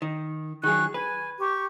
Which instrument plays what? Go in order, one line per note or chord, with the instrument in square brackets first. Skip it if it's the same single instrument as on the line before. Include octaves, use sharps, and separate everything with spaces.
[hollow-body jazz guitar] D#3
[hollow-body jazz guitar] D#3 F#3 [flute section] G#4 C#6 F#6
[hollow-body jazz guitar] B4 [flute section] G#5
[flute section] G4 C#6